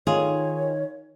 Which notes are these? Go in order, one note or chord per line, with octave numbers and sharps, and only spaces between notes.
D#3 F4 G#4 C#5